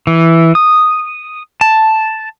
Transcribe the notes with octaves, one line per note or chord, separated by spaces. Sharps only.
E3
D#6
A5